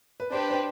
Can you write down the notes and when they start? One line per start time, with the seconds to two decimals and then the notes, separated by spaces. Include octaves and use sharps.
0.20 B4
0.32 D4 G4 B4 C5
0.50 C5